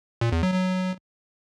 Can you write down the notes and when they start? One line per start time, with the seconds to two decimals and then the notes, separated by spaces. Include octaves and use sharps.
0.21 A#2
0.32 E2
0.43 F#3
0.54 F#3